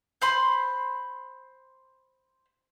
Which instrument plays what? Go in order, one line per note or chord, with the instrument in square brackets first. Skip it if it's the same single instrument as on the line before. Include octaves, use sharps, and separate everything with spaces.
[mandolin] C5 B5 C6